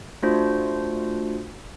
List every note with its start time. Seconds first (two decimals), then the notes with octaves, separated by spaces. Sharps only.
0.23 A3 D4 F4 F#4 C5